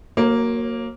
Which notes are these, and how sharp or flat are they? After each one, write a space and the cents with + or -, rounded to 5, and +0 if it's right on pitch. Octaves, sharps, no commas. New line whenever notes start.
F#3 +0 A#3 +0 C#5 -40